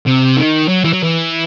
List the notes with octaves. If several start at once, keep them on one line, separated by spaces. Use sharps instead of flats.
C3
D#3
F#3
E3
F#3
E3